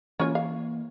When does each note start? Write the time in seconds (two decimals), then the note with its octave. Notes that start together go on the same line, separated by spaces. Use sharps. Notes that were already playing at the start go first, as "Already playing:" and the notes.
0.19 E3 A#3 C#4 F4 C#5
0.35 F5